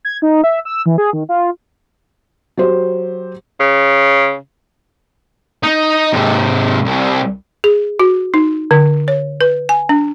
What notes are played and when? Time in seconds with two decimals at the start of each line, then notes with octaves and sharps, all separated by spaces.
0.05 G#6
0.22 D#4
0.44 E5
0.65 E6
0.86 E3
0.98 G#4
1.13 D#3
1.29 F4
2.57 F#3 G4 C5
3.60 C#3
5.63 D#4
6.13 G#2 C3
6.85 C2
7.64 G#4
8.00 F#4
8.34 D#4
8.71 D3
9.08 C#5
9.41 B4
9.69 G#5
9.89 D4